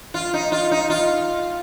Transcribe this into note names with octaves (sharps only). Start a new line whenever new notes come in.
F4
D#4
F4
D#4
F4